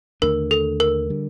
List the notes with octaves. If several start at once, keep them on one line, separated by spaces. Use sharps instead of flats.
D#2 D3 A3 D4 A#4
A4
A#4
D3 G3